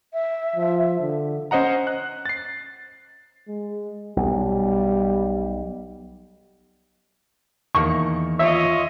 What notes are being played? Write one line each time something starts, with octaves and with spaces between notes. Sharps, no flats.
E5
F3
D3
C#4 C5 D#5 F#5 A#5
F#6
A6 C7
G#3
B1 G3
E2 D#3 A#3 C#6
F4 C#5 D#5 E5